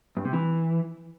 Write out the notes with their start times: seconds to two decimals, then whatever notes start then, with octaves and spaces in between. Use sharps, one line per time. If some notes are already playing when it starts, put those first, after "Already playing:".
0.17 G2
0.25 C3
0.33 E3